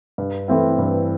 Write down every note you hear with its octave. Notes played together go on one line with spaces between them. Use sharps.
G2
E3 A3 C4 E4
G2